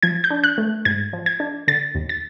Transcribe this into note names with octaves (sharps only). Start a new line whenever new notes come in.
F3 G#6
G6
D4
F#6
A3
G#2 G#6
F3
G#6
D4
D3 A6
D#2
A6